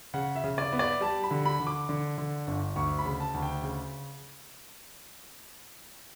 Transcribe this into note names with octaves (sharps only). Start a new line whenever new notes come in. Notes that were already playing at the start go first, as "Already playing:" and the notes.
C#3 F#5
E5
C#3
D5
B3
D5
G3 A5
B5
D3
B5
D3
D6
D3
D3
G1
D2 C#6
B5
C#3
A5
D2
G5
C#3